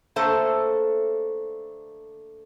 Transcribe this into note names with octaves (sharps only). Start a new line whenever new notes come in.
D3 A3 A#3 A4 C5 A5